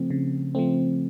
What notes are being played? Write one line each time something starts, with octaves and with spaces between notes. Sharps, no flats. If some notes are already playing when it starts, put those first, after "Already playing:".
Already playing: C#3 F3 A3 C4
C#3
F3 A3 C4